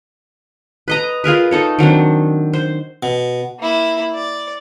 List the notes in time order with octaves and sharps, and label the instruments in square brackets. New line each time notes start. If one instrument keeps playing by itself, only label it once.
[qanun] B4 D#5 A#5
F4 G#4 A#4 B4
D#4 A4 C#5
D#3 F#3 C4 D4
C5
[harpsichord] B2
[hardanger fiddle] A#3 E4
D5